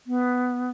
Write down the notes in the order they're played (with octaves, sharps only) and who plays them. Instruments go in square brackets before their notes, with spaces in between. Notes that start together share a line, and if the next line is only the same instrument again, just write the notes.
[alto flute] B3